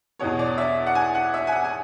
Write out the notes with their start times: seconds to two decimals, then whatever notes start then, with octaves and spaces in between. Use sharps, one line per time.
0.19 E2 B2 C#5
0.39 D5
0.58 E5
0.86 F#5
0.95 G#5
1.15 F#5
1.34 E5
1.47 G#5
1.52 F#5
1.64 G#5